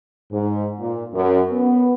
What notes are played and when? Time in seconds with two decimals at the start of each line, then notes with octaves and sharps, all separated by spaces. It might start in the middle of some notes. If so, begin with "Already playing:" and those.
0.30 G#2
0.80 A#2
1.14 F#2
1.51 B3